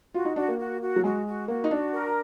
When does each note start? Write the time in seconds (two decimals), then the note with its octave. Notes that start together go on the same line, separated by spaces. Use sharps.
0.14 F4 F#4
0.25 D#4
0.36 D4 F#4
0.48 A#3
0.58 F#4
0.81 F#4
0.96 F#3
1.04 G#3 F#4
1.26 F#4
1.48 A#3 F#4
1.64 D#4
1.71 D4 F#4
1.93 A#4